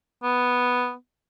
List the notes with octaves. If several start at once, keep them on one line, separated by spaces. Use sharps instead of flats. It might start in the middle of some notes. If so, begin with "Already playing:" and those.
B3